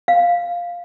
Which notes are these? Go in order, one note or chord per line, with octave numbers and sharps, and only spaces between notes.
F5